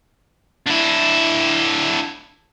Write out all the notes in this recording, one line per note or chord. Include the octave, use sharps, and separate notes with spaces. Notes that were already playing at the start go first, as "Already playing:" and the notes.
D3 E4